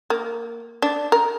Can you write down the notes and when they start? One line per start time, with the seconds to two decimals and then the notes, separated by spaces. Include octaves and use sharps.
0.10 A#3
0.82 D4
1.12 A#4